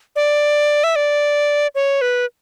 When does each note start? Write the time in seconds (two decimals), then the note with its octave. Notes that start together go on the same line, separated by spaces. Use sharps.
0.16 D5
0.84 E5
0.96 D5
1.75 C#5
2.01 B4